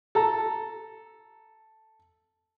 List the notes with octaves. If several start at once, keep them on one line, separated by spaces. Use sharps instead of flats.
A4 A#5